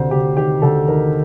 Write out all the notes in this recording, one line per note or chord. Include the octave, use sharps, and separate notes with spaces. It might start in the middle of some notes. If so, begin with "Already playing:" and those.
Already playing: D2 C3 C5
D2 G4
D#3 G4
D2 A4
D#3 A#4